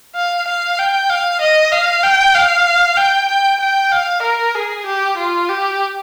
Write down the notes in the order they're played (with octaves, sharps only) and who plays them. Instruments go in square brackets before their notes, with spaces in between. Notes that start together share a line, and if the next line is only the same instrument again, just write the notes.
[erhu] F5
F5
G5
F5
D#5
F5
G5
F5
G5
G5
G5
F5
A#4
G#4
G4
F4
G4